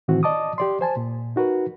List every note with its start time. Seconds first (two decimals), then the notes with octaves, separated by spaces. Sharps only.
0.08 A2 D#3 E3 C4 F#4
0.23 D5 D#5 A5 D6 D#6
0.58 G4 D5 C6
0.81 C5 G#5 A5
0.97 A#2
1.36 D#4 F#4 A#4 B4